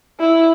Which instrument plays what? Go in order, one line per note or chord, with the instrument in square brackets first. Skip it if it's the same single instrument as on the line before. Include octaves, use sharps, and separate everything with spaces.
[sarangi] E4